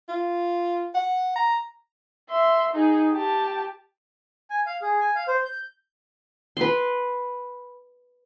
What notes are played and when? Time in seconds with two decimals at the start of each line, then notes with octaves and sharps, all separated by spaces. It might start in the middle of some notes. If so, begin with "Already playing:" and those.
0.09 F4
0.95 F#5
1.36 A#5
2.30 E5 C6
2.73 D#4 G#4
3.13 G4 A5
4.50 G#5
4.66 F5
4.82 G#4
5.00 G#5
5.15 F5
5.28 C5
5.45 G6
6.57 B4 C6